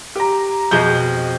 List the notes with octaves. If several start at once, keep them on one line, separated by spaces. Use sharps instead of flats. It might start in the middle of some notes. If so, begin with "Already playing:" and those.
G4 A#5
F2 B2 G#4 D#5 G6